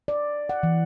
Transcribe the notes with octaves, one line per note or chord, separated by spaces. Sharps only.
D5
F#5
E3